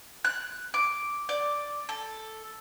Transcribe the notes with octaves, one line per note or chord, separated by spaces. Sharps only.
F#6
D6
D5
A4